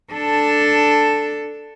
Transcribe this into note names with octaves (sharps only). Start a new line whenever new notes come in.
D4 A4